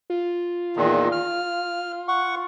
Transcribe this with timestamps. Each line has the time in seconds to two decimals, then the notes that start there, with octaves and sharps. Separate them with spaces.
0.10 F4
0.76 E2 A#2 D#3
1.12 F6
2.08 F#5 C#6